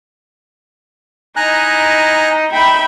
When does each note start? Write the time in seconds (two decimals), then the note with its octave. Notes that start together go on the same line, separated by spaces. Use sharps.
1.36 D#4 E4 D#5 G#5 A#5 F#6
2.51 D#4 E5 G5 B5